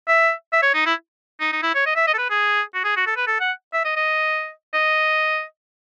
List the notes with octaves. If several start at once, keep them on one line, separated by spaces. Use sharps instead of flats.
E5
E5
C#5
D#4
E4
D#4
D#4
E4
C#5
D#5
E5
D#5
A4
B4
G#4
F#4
G#4
F#4
A4
B4
A4
F#5
E5
D#5
D#5
D#5